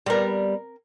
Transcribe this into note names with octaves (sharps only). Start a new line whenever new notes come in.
G3 B3 C4 A#4